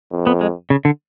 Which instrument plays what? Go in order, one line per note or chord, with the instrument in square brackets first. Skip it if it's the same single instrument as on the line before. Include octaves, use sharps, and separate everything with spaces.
[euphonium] F2
[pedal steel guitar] B3
G#3
C#3
D3